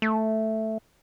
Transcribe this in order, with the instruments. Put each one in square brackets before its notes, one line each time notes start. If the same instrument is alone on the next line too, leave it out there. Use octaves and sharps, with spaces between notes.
[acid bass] A3